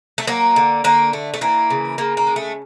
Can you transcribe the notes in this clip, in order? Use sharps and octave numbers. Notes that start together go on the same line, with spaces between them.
A3
F#3 A#3
D3
D3 A#3
A3
A3
E3 A#3
C#3
C#3 A#3
A#3
G#3
A3